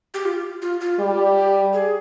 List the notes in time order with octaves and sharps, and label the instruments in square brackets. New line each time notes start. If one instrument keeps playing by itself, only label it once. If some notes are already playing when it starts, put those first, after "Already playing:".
[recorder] G4
F4
F4
F4
[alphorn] G3 [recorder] G4
[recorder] G#4